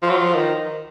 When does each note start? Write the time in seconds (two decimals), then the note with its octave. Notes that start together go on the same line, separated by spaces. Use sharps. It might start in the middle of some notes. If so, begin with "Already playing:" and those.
0.02 F3
0.10 F#3
0.17 F3
0.35 D#3